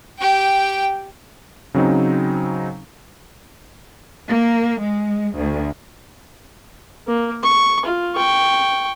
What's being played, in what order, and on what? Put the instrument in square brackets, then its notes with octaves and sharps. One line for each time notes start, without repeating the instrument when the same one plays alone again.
[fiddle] G4 G5
[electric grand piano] C#3 F#3 C4 D#4
[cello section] A#3
G#3
D2
[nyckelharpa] A#3
C#6
F4
G5 C#6